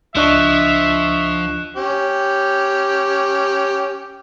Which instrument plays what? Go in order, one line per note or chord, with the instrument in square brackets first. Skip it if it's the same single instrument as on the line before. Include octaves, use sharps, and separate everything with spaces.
[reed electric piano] C#2 D4 D#5 [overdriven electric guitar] F3 [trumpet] E5 [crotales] C#6 F#6 E7
[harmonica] C#4 G4